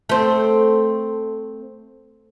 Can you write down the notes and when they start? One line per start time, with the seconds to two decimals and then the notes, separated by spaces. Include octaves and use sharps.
0.09 A3 C4